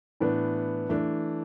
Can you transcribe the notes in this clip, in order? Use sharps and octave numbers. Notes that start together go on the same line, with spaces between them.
A2 E3 B3 D4
E3 A3 D4